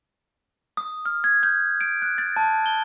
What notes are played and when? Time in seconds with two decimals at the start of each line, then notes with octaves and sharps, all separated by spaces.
0.77 D#6
1.06 F6
1.24 G#6
1.43 G6
1.81 D7
2.02 F#6
2.18 A6
2.36 A5
2.66 G7